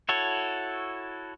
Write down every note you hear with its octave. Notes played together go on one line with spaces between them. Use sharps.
E4 F#4 A4 C#5